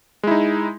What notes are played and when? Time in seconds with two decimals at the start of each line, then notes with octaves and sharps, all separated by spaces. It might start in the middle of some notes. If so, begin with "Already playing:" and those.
0.23 G#3
0.27 E4
0.31 D#4